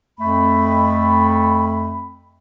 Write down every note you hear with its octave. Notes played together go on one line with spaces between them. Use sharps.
F2 A3 B5